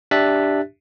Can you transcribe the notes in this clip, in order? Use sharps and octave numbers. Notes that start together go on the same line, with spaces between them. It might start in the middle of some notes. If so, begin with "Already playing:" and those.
D4 G4 E5 F#6 A6 B6